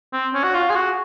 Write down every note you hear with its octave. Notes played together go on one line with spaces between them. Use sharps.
C4
C#4
F#4
F4
G#4
F#4